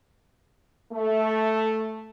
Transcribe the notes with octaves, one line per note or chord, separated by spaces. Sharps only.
A3